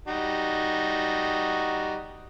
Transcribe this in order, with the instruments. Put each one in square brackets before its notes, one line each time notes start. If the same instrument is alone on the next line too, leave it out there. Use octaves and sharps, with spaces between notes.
[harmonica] G3 D#4 F#4